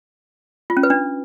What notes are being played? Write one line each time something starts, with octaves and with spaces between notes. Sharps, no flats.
F4
C#4
B4
D4